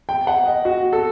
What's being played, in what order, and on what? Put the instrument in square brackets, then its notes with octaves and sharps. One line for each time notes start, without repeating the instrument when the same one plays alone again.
[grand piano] G5
F#5
D#5
F#4
A4